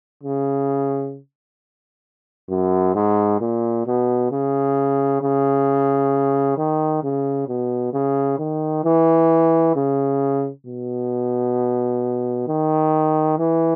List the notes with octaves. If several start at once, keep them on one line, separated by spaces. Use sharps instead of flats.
C#3
F#2
G#2
A#2
B2
C#3
C#3
D#3
C#3
B2
C#3
D#3
E3
C#3
B2
D#3
E3